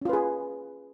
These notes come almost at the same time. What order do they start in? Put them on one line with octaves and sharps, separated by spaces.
C#4 F4 B4 G#4